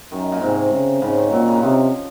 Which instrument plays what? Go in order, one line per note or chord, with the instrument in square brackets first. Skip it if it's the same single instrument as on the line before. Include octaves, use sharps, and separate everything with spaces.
[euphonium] F#2 [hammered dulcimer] D#3
[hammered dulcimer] A#2
[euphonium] G#2 [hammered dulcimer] C3
[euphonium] C#3
[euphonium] G#2 [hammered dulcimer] C#3
[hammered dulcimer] D#3
[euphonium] A#2 [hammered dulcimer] F#3
[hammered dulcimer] C#3
D#3
[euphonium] C3 [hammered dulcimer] F3